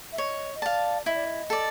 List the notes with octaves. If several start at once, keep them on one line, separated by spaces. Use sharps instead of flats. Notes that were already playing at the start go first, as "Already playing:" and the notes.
E5
C#5 D#5
D#5
D5 F5 A5
E4 D#5
D5
D#5
A4 D5